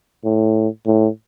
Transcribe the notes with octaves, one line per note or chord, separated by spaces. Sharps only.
A2
A2